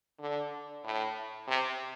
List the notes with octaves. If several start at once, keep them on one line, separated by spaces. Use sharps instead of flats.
D3
A2
C3